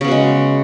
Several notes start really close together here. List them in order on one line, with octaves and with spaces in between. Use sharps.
C#3 B3 F#4 G#3